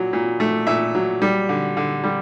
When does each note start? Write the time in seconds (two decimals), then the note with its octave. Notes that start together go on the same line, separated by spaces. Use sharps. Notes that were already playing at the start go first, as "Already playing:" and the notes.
Already playing: A#2 F#3
0.13 A#2
0.40 A3
0.67 A#2 E5
0.95 F#3
1.22 G3
1.49 D3
1.77 D3
2.04 G3